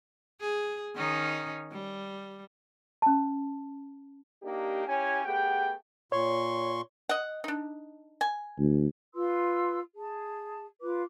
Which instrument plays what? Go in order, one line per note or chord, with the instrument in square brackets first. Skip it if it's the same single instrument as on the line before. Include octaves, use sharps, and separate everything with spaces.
[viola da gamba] G#4
D#3 C#4 D#4
G3
[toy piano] C#4 A5
[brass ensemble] A#3 D4 D#4 G4
C#4 E4 G4 C#5 G#5
A3 B3 G4 G#4 F#5 G5
[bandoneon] A#2 C6 C#6 [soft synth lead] C#5
[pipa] D#5 F#5
D4 D#4
G#5
[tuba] D2
[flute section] F4 B4 C6 E6
G#4 A5
F4 B4 D6